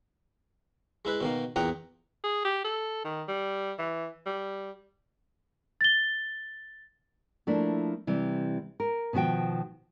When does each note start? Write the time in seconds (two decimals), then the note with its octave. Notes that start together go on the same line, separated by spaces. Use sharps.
1.05 G#3 E4 B4
1.21 B2 D#3 A#3
1.56 E2 A#2 F#5 G5 A#5 D#6
2.24 G#4
2.45 G4
2.64 A4
3.04 D#3
3.28 G3
3.79 E3
4.26 G3
5.81 A6 G7
7.47 F3 A3 A#3 D4 E4
8.07 C3 E3 G3
8.80 A#4
9.13 B2 D#3 F3 F#4 G5